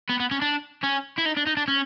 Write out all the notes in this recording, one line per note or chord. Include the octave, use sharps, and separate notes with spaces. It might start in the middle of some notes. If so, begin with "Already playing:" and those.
B3
B3
C#4
D4
C#4
E4
D#4
D4
D#4
D4
C#4